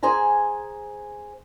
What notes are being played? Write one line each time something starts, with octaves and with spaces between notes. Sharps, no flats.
G#4 C5 G#5 A#5